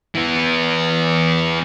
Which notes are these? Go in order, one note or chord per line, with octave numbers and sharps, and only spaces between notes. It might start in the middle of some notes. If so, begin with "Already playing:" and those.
E3 B3